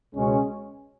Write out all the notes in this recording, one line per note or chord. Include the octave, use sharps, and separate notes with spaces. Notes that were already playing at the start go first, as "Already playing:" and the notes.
C#2 B2 G#3 C#4